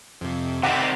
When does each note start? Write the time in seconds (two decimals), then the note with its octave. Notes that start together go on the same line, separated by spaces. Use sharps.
0.21 F2 C3
0.63 C3 D#3 C4 D5 F#5 B5